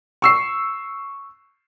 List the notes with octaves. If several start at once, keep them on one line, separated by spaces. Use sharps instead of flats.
C#6 E6 C7